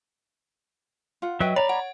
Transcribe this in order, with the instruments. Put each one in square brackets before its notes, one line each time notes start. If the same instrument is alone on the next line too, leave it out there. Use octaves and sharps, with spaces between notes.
[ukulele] F4 F#5
[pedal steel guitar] F#3 E5 [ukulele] B4 D#5 G5
[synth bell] C#5 [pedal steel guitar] D5 A#5 B5
[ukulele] C#5 [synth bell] F#5